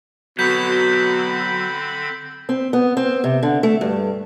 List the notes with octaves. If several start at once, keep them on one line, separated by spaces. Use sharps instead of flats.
B2 D3 F#3 C4 B5 G6 B6
C4
B3
C4
C3
D3
A3
G2